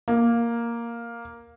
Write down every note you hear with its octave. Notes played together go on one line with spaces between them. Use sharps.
A#3